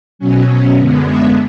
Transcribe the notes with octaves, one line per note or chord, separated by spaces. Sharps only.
B2 F#3 C#4
F#2 D3 G#3 B3
E5